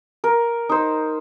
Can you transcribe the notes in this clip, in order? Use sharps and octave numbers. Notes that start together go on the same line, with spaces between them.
A#4
D#4 C5